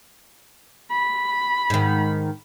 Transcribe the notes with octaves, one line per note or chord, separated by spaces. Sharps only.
B5
G#2 D#3